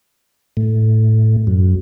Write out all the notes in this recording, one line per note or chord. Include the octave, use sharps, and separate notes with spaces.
A2
F#2